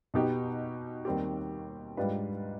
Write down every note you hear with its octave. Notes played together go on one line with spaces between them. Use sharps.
B2 B3 D#4 G4
D#2 D#3 G3 C4 G4
G#2 G3 D4 F4 B4